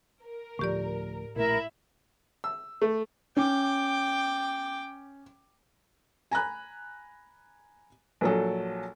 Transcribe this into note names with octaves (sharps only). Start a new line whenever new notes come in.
A#4
D2 A2 F3 G4 D5
A#1 A3 E4 A#4 E5 B5
E6
A3
C#4 G5 D6
G#5 A#5 B5 F#6
A#1 F#3 A4